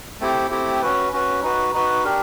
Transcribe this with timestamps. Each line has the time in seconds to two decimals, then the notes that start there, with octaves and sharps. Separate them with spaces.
0.20 A3 C4 E4 G4
0.50 A3 C4 E4 G4
0.82 C#4 F#4 B4
1.12 C#4 F#4 B4
1.42 D#4 F#4 B4
1.73 D#4 F#4 B4
2.04 D4 G4 A#4